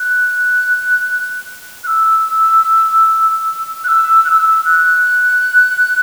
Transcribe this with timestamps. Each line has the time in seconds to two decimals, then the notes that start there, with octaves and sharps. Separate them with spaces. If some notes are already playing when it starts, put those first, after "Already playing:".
Already playing: F#6
1.84 F#6
1.87 E6
3.84 F#6
3.88 E6
4.25 F#6
4.29 E6
4.65 F#6